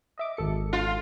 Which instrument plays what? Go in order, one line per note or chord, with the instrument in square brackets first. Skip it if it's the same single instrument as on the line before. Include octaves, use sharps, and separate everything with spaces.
[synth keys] D#5 E5 D6
G#1 A4 C#7
[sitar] F4